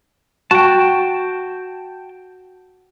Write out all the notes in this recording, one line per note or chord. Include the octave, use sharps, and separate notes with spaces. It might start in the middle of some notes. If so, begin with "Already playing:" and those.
F#4 G5 A5